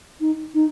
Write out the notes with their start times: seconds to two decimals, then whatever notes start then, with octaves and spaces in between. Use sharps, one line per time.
0.21 D#4
0.54 D#4